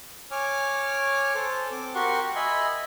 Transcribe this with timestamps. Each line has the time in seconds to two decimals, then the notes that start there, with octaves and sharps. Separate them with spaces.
0.31 C#5 G#5 D6 F6
1.35 A4 C5
1.71 C4 D6
1.95 F#4 G4 A#4 F#5 C6 C#6
2.35 D#5 E5 G#5 B5 C6